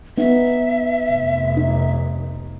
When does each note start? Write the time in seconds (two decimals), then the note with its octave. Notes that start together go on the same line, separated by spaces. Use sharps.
0.18 B3 D#4 E5
1.11 F1
1.57 D#4